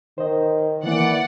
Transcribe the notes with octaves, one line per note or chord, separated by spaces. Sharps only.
D#3 C5 D#5
D#3 E3 A#3 D5 F#5